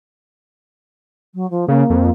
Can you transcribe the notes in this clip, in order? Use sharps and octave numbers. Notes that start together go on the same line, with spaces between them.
F#3
F3
C#3 A#3
F2